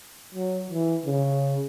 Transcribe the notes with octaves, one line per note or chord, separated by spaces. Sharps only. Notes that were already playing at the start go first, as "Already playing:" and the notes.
F#3
E3
C#3